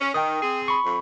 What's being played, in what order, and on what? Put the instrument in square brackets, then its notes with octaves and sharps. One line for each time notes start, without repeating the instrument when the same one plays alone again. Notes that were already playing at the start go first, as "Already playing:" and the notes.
[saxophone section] C#4
[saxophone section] D#3 [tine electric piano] G5 D#6
[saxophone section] C4 G#4
[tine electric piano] B5 C#6
[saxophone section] F2